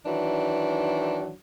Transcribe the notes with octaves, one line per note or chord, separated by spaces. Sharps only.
D#3 E3 F#3 D4